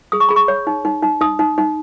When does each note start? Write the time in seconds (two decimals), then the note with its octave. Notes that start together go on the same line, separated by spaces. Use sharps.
0.12 G#4 D#6
0.20 C#6
0.29 G#4 B5
0.36 C#6
0.48 C#5
0.67 D#4
0.85 D#4
1.02 D#4
1.21 D#4 D#6
1.39 D#4
1.58 D#4